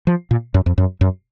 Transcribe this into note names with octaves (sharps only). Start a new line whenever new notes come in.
F3
A#2
F#2
F2
F#2
F#2